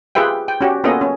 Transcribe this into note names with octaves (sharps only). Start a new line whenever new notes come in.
F4 G4 G#4 B4 E5 G5
G5
C#4 F#4 G4
A#3 B3 C#4 F4 A4 D#5
C#4